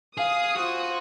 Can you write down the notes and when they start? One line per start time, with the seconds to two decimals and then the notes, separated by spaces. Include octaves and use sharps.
0.17 G#4 F5 D#6
0.56 F4 F#4 C5